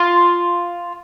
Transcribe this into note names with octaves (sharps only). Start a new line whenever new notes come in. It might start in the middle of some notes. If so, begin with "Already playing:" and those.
Already playing: F4